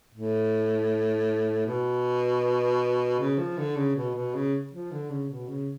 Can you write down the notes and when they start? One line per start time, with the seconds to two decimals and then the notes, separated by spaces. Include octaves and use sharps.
0.14 A2
1.66 B2
3.20 C#3
3.38 F3
3.58 D3
3.76 C#3
3.96 B2
4.15 B2
4.34 C#3
4.73 F3
4.92 D3
5.10 C#3
5.30 B2
5.48 C#3